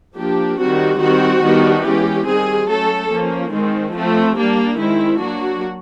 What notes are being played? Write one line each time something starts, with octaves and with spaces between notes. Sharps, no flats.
F3 A#3 D4 G4
D#3 G3 C4 F#4
D#3 G3 C4 F#4
D#3 G3 B3 D4
E3 G#3 C#4 G4
D#3 G3 C4 G#4
F#3 A3 C#4 A4
F3 A#3 C#4
D#3 G#3 C4
F3 A3 C4
G3 A#3 D4
D#3 G#3 C4 E4
F#3 A#3 D4 F#4